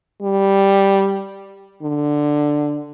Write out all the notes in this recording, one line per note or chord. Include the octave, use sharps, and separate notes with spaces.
G3
D3